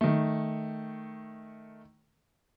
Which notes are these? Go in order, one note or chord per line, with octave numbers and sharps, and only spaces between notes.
D#3 A3